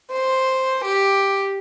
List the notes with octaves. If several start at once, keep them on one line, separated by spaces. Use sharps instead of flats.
C5
G4